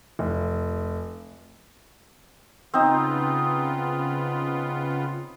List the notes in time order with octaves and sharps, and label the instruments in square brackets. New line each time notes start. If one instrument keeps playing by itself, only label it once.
[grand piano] F1
[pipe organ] C#3 B3 F4 [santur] C4 D#4